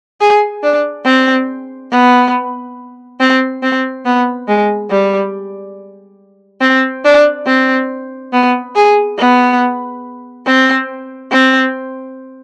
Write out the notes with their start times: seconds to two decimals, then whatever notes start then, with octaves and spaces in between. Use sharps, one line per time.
0.20 G#4
0.63 D4
1.05 C4
1.91 B3
3.20 C4
3.62 C4
4.05 B3
4.48 G#3
4.90 G3
6.61 C4
7.05 D4
7.46 C4
8.33 B3
8.75 G#4
9.18 B3
10.46 C4
11.31 C4